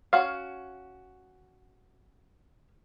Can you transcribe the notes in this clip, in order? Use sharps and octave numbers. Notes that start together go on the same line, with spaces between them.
C#4 F#4 F5